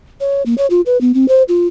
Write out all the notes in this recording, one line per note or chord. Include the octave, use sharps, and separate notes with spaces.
C#5
A#3
C#5
F4
B4
B3
C4
C5
F4